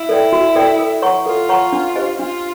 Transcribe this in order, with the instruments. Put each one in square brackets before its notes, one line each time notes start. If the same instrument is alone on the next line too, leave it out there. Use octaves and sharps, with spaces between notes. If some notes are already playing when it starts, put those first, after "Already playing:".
Already playing: [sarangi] E4
[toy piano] A4 D5 G5
F#4
A4 D5 G5
A4
C#5 F#5 A#5 C#6
[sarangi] F4 [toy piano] A4
[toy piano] C#5 F#5 A#5 C#6
D4
G4 C5 D#5 G#5
[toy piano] D4 [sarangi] F4